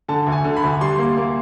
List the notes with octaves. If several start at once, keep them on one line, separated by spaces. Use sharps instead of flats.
D3 A5
D2
G#5
D3
B5
D2
G3 C6
A#3
A#3